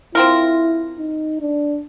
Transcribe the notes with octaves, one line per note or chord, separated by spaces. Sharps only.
C4 E4 F4 A#4
D#4
D4